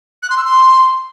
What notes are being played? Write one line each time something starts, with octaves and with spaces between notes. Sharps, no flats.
F#6
C6
E6
C6